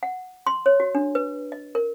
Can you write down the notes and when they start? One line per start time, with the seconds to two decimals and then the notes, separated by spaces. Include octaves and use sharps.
0.03 F#5
0.47 C6
0.66 C#5
0.80 F#4
0.95 D4
1.15 B4
1.52 D#5
1.75 A#4